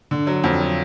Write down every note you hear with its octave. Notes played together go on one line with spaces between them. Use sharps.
D3
F#3
F2
F#3